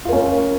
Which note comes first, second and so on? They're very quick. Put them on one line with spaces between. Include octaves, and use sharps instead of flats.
F4 A#4 C#4